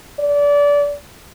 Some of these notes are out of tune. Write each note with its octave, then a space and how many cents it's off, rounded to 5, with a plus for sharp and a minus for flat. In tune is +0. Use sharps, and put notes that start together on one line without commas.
D5 -25